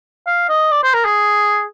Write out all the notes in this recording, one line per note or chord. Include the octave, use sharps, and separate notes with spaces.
F5
D#5
D5
C5
A#4
G#4